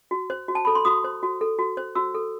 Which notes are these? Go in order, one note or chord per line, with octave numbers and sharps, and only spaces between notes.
F#4
C5
F#4
A5
A4 B5
C6
F#4 D#6
C5
F#4
A4
F#4
C5
F#4 E6
A4